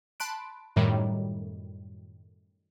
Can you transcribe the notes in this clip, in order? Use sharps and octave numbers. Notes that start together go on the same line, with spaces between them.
A5 B5 C6 F#6 D7
F#2 A2 D#3 G3